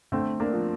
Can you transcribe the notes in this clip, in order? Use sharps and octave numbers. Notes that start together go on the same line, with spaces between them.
D3 A3 C4
A#3 D4
F3